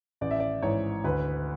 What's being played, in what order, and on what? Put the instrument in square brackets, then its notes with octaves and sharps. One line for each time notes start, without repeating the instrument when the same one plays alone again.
[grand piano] A1 D5
E5
D5
G#2 E3 C#5
D2 B4